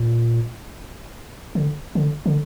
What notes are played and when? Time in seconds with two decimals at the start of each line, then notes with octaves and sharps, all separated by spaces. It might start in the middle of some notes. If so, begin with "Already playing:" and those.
Already playing: A#2
1.55 D3
1.95 D3
2.26 D3